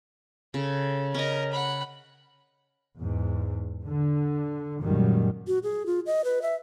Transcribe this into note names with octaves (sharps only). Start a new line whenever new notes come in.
C#3 A4
C#4 A#4 D#5 A#5
F#5 B5
E2 G#2
D3
C#2 F#2 A#2 D#3 F#3 G3
F#4
G#4
F4
D#5
B4
E5